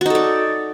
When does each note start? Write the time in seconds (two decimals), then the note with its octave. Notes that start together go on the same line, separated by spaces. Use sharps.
0.01 F#4
0.06 D#4
0.10 A4
0.15 D5